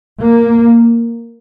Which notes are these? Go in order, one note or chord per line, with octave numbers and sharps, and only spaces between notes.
A#3